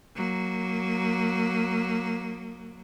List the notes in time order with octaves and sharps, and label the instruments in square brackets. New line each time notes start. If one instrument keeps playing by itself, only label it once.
[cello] F#3 A#3